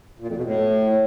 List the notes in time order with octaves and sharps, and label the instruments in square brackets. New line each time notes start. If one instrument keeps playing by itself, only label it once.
[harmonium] A#2
F2
B2
A2